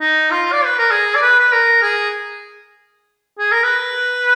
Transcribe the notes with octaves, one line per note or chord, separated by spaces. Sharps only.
D#4
F4
D5
B4
A#4
G#4
D5
B4
B4
A#4
G#4
G#4
A#4
B4